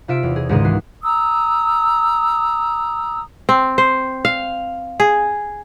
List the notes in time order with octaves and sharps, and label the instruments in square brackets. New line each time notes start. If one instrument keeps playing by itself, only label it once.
[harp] C3 F4 E5 D7
E2
G#4
C#2 G#2 D#3 G#4 D#5 D#6
E3 F#4 C7
[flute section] A#5 D#6 E6
[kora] C4
C5
F5
G#4